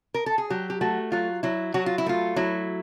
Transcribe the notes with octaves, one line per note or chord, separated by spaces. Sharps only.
A#4
A4
G#4
F#3 G4
G4
A3 F#4
F#3 F4
F#3 E4
F#3 F#4
F4
E4
A3 F4
F#3 E4